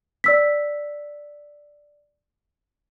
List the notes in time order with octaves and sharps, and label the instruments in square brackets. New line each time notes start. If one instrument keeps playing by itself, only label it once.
[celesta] D5 E6 B6